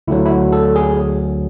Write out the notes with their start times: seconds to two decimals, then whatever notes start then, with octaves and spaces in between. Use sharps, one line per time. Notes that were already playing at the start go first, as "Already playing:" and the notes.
0.08 D2 D3 F#3 E4
0.26 E4
0.30 F#4
0.53 A4
0.76 G#4